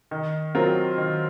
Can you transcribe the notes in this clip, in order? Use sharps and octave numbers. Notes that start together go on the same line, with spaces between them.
D#3
F#3 C4 F4 A#4
D#3